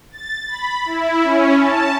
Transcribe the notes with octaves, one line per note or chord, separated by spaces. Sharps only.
A6
B5
E4
C#4
A5